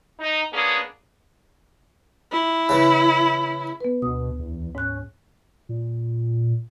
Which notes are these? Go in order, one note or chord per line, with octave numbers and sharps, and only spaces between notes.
D#4
A#3 B3 C#4 D4 G#4
E4
C#3 E3
B3 B4
D2 B2 D#6
E2
G#2 C#4 F#6
A#2